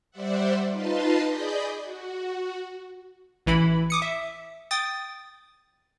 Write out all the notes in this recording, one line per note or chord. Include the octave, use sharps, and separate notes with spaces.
G3 C5 D5 E5 F#5
D#4 F4 B4 D#5 A5 C6
G#4 D5 D#5 B5 G6
F#4
A1 E3 E4 B5
D6 D#6 C#7
E5
G5 D#6 A6